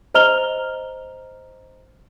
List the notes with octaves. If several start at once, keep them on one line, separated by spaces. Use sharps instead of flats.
C5 D#5 A#5 F6 F7 G7